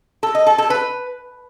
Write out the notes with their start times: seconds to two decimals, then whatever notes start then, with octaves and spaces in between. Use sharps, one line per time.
0.23 A4
0.35 D#5
0.47 A4
0.58 A4
0.70 B4